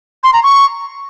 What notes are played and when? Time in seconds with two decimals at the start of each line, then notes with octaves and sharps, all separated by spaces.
0.24 C6
0.33 A#5
0.43 C#6